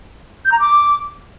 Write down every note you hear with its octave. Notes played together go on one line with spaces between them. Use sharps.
G6
A#5
D6